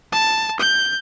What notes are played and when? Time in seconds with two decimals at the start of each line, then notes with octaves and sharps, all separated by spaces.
0.12 A5
0.60 G6